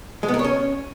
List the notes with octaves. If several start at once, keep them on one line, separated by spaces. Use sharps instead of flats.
G#3
B3
A#4
C#5
C#4